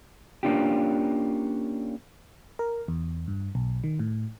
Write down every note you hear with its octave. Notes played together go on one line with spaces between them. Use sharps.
A#3 C#4 D4 F4 G4
A#4
E2
G2
B1
D#3
A2